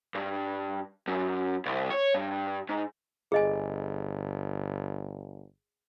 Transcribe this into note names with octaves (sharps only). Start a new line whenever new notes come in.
G2
F#2
C2
C#5
G2
G#2
G1 G#4 D#5 G#5